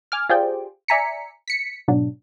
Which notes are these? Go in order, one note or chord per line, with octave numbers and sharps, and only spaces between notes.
G#5 D6 F6
F4 G4 G#4 C5 D5 G5
D5 E5 G#5 A#5 B6 C#7
B6 C#7
G#2 B2 F#3 D4